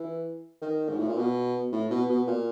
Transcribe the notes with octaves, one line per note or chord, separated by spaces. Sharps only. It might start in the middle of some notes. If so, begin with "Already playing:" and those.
Already playing: E3
D#3
G#2
A2
A#2
B2
A2
B2
B2
A#2